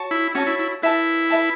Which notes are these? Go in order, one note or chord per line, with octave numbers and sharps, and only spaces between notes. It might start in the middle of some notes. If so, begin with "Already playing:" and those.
Already playing: F#4 C#5 A5 C#6
E4
C#4 F#4 C#5 A5 C#6
E4
E4
E4 B4 E5 A5
B4 E5 A5